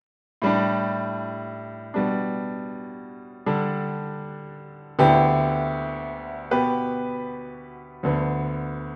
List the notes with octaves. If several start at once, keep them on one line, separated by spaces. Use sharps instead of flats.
A2 G3 D4
B2 G3 D4
D3 G3 D4 A4
D2 D3 B3 E4 G4
B2 B3 G4 B4
D2 D3 B3